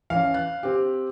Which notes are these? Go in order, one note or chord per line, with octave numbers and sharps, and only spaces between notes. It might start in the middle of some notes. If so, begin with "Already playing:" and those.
E3 C#4 F5
F#6
C4 G4